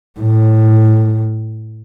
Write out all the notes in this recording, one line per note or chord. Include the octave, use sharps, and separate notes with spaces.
A2